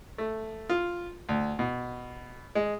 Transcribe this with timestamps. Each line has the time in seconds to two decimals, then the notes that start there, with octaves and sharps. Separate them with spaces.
0.18 A3
0.69 F4
1.29 D2
1.59 B2
2.55 G#3